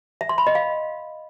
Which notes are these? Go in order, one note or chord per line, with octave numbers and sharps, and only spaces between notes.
E5
C6
B5
D#5
F5